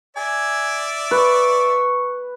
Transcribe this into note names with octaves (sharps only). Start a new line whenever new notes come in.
D5 E5 G#5
B4 C#6